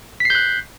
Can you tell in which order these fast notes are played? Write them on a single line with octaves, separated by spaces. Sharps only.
B6 C7 G6 F#6